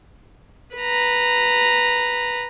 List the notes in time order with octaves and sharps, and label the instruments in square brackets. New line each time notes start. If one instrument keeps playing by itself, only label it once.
[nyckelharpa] B4 A#5